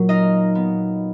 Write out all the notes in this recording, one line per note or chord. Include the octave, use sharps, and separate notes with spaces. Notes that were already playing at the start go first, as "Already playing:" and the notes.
Already playing: A#2 F#3
D#4 D#5 F5
B3